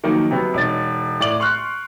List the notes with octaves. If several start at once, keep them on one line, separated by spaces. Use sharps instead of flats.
D#3 F3 F#3 A#3 D#4
C3 F#3 B3
E1 D#4 C#5 A6
A2 D5 D6 F#7
C6 C#6 F6 F#6